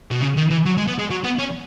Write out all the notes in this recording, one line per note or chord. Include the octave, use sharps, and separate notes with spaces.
B2
C#3
D#3
E3
F#3
G#3
B3
G#3
F#3
B3
C#4